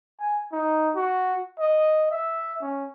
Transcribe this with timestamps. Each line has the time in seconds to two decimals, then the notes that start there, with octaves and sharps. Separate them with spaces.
0.20 G#5
0.52 D#4
0.96 F#4
1.59 D#5
2.11 E5
2.62 C#4